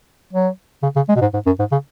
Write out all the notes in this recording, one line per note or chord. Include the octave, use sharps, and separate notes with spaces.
F#3
C#3
C#3
G#3
B2
G#2
G#2
F#2
G#2
C#3